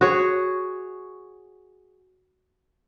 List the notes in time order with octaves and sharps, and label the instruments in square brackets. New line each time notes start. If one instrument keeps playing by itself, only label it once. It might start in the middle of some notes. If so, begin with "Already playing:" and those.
[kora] F#4 G#4 C#5